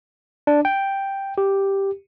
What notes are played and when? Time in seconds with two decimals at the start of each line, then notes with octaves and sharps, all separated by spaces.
0.47 D4
0.65 G5
1.38 G4